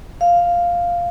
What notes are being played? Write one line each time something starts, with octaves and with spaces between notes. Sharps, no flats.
F5